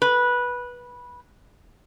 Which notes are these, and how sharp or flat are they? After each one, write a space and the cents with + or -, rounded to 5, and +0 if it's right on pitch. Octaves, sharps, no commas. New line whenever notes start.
B4 -15